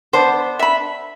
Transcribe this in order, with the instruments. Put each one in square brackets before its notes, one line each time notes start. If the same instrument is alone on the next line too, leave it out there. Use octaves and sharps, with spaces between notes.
[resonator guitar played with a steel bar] B3 D4 [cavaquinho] C5
[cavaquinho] E5 B5